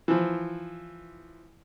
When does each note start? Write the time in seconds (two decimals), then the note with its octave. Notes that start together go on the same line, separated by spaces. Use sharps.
0.08 E3 F3